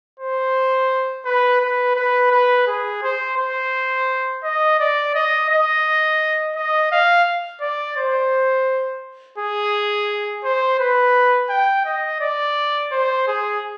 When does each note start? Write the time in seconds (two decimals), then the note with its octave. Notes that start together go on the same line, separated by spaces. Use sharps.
0.20 C5
1.25 B4
1.60 B4
1.96 B4
2.31 B4
2.67 G#4
3.03 C5
3.37 C5
4.43 D#5
4.79 D5
5.15 D#5
5.49 D#5
6.56 D#5
6.91 F5
7.61 D5
7.97 C5
9.38 G#4
10.44 C5
10.79 B4
11.50 G5
11.86 D#5
12.20 D5
12.91 C5
13.28 G#4